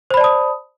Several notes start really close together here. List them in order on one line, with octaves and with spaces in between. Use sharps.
C5 B5 D5 A5 D#6